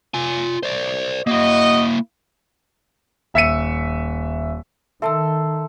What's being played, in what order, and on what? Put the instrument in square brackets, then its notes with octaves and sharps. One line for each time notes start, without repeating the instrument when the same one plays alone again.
[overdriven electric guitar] F4 G#5
C5 D5
[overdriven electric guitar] A#3 E4 [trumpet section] F#4 D#5
[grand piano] D#1 E5 E6 B6 C#7 D#7
[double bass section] D#3 [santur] A4 C6 [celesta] E5 A5 E6